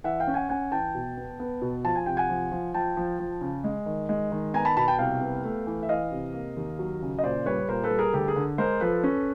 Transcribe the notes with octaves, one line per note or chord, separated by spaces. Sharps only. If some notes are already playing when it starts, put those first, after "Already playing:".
E3 E5 F#5
F5 G5
C#4
F#5 G#5
C#4 F#5 G#5
E3 G5 A5
B2
B3
B3
B2
F3 A5
G#5
C3 G5
F#5 G#5
F3
F3
F3 G5 A5
F3
F3
C#3
G#3
D#3
G#3
D#3
B3 G#5 A#5
A5 B5
B2 A5 B5
G5 A5
C2 F5 G5
B3
A3
E3
E5
E3 D#5 F5
C3
A#3
D#2
F#3
C#3
D#5
A#2 C5 D5
G3 B4 C#5
A#2 A#4 C5
A4 B4
G3
G#4 A#4
D2 G4 A4
G#4 A#4
D3
G#3 A#4 C5
F3 A4 B4
C#4